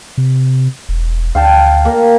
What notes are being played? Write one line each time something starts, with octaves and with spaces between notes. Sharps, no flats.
C3
E1
D2 F5 G5 A5
A#3